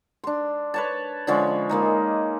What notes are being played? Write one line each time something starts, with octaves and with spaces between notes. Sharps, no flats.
D4 C6
B4 C#5 A5
D3 F3 G#3 C#4
G#3 A#3 D#4